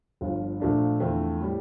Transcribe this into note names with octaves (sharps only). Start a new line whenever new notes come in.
G1 G2 F3
A#1 A#2 A3 D4
E2 D3 F3 A3 C4
A2 G3